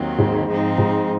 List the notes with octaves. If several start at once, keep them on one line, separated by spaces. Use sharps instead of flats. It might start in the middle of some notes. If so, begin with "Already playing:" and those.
Already playing: D#2 D#3 F#3 C4
G#2
F3 G#3 C4 D#4
G#2